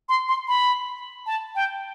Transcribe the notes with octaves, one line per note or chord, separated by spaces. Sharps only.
C6
C6
B5
A5
G5